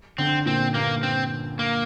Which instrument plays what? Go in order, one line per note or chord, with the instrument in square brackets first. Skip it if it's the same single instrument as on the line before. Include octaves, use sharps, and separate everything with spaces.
[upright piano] D3 [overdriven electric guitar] C4
[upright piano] A#2 [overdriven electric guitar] C4
[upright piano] G2 [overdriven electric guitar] A#3
[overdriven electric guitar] C4
A#3